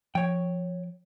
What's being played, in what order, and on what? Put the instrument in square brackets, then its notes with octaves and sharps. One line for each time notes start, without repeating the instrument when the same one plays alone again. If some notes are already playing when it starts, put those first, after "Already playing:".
[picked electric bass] F3 [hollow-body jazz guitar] C#5 G5